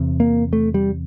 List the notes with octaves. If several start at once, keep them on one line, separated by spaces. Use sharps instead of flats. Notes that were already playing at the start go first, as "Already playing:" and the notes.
Already playing: E2 C3
A#3
A3
G3